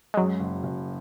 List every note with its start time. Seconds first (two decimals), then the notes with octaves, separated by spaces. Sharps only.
0.14 G#3
0.17 F#2 F#3
0.40 F#1
0.63 F#1